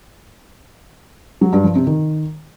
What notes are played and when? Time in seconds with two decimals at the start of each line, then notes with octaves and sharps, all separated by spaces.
1.41 F#3
1.53 G2
1.64 F3
1.75 C3
1.87 D#3